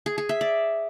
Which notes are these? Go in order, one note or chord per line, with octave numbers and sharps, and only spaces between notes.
G#4
G#4
E5
D5